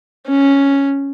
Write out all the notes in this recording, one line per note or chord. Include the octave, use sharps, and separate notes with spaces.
C#4